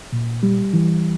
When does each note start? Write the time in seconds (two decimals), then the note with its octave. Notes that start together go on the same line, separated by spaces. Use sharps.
0.12 A#2
0.43 G3
0.74 E3